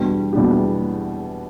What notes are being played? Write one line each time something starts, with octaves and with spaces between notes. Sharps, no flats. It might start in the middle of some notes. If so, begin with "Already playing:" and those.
Already playing: E2 B2 G3 D4 G4
E2 B2 G3 D4 G4